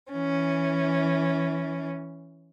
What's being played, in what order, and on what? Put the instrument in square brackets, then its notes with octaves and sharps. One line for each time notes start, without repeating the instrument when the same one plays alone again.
[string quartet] E3 C#4